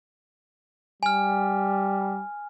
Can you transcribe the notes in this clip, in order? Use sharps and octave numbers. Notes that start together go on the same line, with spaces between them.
G3 G#5 F6